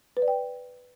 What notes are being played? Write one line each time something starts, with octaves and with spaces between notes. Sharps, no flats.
B4
D5
G5